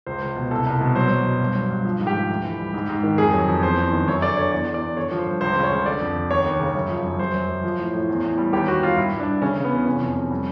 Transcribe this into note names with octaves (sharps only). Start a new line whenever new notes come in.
C#2 C5
C#2
B2
C2 A4
C2
B2
F#3 C5
F#3
B2
G2
F#3
G2
F3
G#2
G4
F3
D2
E3
G3
G#2
G#2
D#3
F2 G#4
F#3
F2
E2 C5
E2
D#3
F#2 C#5
D3 D5
D3 C#5
E2 D5
E2
D5
E2
D3 C#5
F3
C5
G2
C#2 C5
C#3
C#5
C#3
D3 D5
F2
D3
D#2 C#5
D#2
C#3
F#2
F3
F#2
F#3 C5
F#2
F#2
F3
A2
A2
E2
E2
G3
D#2 G4
D#2 F#4
G3 F4
G2 E4
G2
D4
G2
C#3 C#4
C#3
B3
E2
C3 C#4
F2
F2
G3